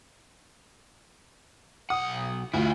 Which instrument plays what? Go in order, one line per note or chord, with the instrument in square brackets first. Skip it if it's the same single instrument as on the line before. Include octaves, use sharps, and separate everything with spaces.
[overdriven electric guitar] B1 F#5 [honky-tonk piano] D#6
[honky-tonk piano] D2 [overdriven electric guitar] E4 F4